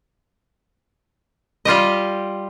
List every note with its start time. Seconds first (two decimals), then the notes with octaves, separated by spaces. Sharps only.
1.65 G3 F4 G4 D#5